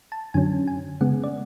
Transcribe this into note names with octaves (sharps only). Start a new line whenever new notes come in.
A5
F#2 D3 F#3 C#4 G#5
G#5
C#3 G#3 B3 F#5
D5